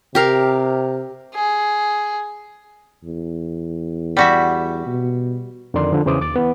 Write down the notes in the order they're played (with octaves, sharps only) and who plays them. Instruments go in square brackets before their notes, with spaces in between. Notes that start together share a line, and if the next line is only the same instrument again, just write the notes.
[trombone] C3 [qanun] G4 A#4 F5
[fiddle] G#4
[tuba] E2
[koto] G3 F#4 E5
[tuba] B2
[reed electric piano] F2 D3 D#3 A#4 D5 C6
D3 F3
E2 C#3 E3 C5 D6 D#6
D#2 D6 A6
E3 B3